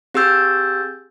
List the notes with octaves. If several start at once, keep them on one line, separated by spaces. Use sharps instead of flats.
C4 G4 G#4 E6 G6 A6